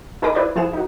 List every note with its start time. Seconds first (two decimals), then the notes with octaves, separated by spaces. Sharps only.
0.22 D#4 G#4 A#4 D#5 B5 D6
0.35 E4 B4 C5 D5 G#6
0.55 F3 E4 G#4 F#5 E7
0.73 D#4 F#4